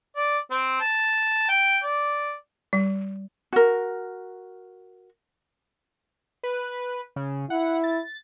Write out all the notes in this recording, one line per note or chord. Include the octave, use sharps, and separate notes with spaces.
D5
C4
A5
G5
D5
G3
F#4 A#4
B4
C#3
E4 F#5
A6